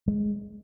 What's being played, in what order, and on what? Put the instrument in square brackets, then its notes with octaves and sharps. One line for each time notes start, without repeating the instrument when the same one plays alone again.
[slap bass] G#3